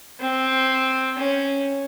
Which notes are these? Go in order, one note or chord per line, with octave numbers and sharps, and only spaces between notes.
C4
C#4